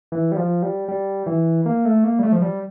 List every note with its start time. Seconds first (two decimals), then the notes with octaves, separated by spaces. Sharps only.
0.12 E3
0.32 G3
0.37 F3
0.63 G3
0.88 G3
1.26 E3
1.66 A#3
1.85 A3
2.04 A#3
2.19 G3
2.23 A3
2.32 F3
2.42 G3